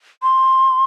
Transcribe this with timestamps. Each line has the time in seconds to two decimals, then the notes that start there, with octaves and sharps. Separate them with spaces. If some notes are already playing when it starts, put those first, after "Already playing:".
0.22 C6